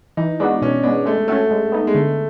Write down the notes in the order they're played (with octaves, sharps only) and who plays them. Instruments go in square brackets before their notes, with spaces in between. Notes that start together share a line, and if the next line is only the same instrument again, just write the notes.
[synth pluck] E3 [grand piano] D#4
[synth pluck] G#3 B3 D#4 F#4 [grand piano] D4
[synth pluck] B2 [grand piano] C#4
[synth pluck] G#3 B3 [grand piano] D4
[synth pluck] G#3 [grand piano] A3
[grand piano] A3 [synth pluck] C#4 F#4 A4
[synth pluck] G#3
B3 D#4
[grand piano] G#3
[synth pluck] D3 [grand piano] A3